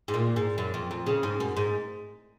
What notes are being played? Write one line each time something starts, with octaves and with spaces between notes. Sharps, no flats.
G#2
A#2
G#2
F#2
F2
F2
C#3
G#2
F#2
G#2